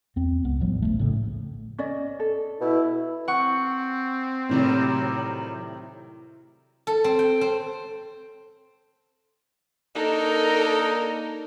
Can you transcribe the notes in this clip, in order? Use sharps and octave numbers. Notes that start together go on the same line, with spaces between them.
E2 C4
C#2 B3
A1 F3 G3
A#1 F2 A3
A2 C#3
C#4 D5 D#5
A4
B2 E4
C4 F#5 C#6
A2 C3 D#3 F#3 G3
A4
C4
G5
C4
A#3 D4 D#4 A4 A#4